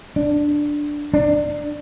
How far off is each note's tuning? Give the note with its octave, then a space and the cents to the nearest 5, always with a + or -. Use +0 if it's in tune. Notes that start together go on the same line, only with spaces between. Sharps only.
D4 +5
D4 +15